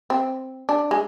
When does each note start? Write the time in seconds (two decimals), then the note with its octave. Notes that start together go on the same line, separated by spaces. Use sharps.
0.10 C4
0.69 D4
0.91 G#3